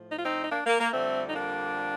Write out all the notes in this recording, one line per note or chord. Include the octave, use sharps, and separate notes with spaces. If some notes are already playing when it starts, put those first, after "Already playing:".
Already playing: A2 F3
D#4
F4
C4 D#4
D#4
A#3 D4
A#3
A#3
F2 D3 G3 A3 C4
D#4
A#3 D4